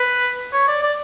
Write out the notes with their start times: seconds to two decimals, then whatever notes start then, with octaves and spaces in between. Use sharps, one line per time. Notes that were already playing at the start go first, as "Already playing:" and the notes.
Already playing: B4
0.53 C#5
0.68 D5
0.83 D5